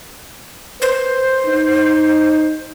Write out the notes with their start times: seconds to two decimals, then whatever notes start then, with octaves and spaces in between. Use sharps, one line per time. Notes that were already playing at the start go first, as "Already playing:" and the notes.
0.82 B4 C5
1.47 D#4